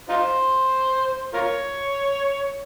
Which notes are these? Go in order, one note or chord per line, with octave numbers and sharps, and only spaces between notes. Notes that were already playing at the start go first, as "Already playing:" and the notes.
D#4 F4 C5
F4 A#4 C#5